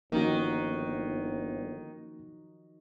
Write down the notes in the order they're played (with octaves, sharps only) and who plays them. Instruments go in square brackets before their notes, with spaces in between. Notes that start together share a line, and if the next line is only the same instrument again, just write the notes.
[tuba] G1 [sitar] D#3 [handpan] F3 D#4 F#4 [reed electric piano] A#3 C#4